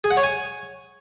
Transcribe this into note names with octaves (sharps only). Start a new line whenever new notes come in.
G#4
F#5
C#5
G#5